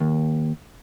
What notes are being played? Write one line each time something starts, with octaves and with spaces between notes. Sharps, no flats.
D#2